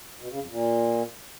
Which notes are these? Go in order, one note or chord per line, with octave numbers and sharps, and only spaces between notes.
B2
C#3
F2
A#2